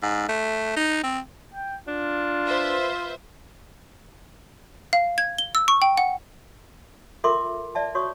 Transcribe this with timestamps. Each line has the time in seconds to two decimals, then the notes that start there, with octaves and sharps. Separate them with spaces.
0.03 G#2
0.29 A3
0.76 D#4
1.04 C4
1.54 G5
1.88 D4 F4
2.45 B4 C5 E5
4.93 F5
5.18 G#6
5.38 G7
5.55 E6
5.68 C#6
5.82 G5
5.97 F#5
7.24 F4 A4 A#4 E5 C6 D6
7.75 D5 E5 A5
7.95 F#4 C#5 C#6 D#6